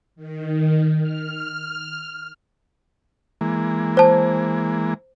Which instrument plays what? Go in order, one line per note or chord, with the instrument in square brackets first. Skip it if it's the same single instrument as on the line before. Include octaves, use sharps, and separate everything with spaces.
[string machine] D#3
F6
[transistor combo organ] E3 G#3 A#3
[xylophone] C5 A5